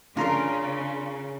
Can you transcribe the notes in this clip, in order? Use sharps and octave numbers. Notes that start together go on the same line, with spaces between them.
C#3 D4 F4 A#4 A#5 C6